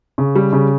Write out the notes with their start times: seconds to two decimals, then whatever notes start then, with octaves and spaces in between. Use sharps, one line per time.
0.18 C#3
0.35 G3
0.53 C#3